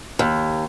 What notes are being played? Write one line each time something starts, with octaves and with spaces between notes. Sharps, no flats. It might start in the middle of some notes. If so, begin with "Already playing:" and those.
D#2